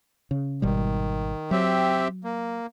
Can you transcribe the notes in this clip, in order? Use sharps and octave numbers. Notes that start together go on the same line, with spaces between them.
C#3
G#1 B2 D#3 G3
F#3 C4 G4 E5
A#3